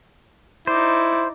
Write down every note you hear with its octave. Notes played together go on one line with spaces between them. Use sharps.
D#4 E4 C5 D5